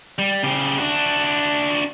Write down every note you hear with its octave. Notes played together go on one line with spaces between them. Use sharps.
G3
C#3 G4
D4 F#4